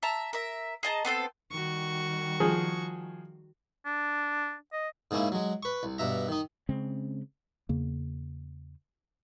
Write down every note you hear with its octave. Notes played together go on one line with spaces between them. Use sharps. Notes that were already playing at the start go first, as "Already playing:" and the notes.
E5 A5 A#5
A#4 E5
G#4 D#5 A5 A#5
B3 C4 A4 C5
D#3 G3 F#4 C#6
F3 G#4
D4
D#5
G#2 C#3 A#3 C#4 E4
F#3 G#3
B4 C#6
C2
G2 B2 E5 A#5
D#3 D#4
C#3 G#3 C4 C#4
E2 C#3 A#3